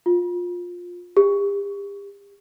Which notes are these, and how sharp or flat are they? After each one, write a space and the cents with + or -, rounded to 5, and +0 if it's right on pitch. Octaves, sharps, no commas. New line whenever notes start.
F4 +15
G4 +40